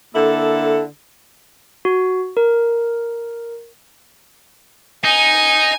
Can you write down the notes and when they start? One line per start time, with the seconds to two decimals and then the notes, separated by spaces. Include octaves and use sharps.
0.15 D3 A#3 E4 A4
1.85 F#4
2.37 A#4
5.04 D#4 G#5